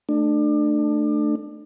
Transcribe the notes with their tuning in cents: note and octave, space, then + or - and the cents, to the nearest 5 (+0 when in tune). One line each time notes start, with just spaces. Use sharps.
A3 +0 D4 +30